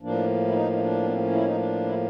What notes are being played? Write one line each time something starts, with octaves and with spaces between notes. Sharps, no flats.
A2 F3 A#3 D4
E4
D#4
D#4
D4
B3
C4
C#4
E4
D#4
D4
E4